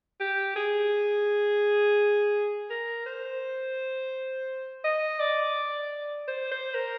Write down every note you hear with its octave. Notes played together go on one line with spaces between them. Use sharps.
G4
G#4
A#4
C5
D#5
D5
C5
C5
A#4